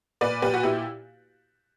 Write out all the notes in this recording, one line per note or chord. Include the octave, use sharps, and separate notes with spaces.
A#2 B4 D5
A#2 G4 B4
F#4
A#2 E4 G4